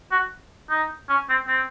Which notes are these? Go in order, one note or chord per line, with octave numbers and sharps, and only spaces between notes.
F#4
D#4
C#4
C4
C4